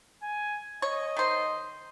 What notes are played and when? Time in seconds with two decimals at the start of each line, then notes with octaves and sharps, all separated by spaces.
0.23 G#5
0.82 C#5 D#5
1.17 D#3 C5